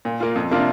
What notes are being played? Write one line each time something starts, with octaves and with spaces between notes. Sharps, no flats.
A#2
A#3 F4
F2
C3 A#3 D4 F4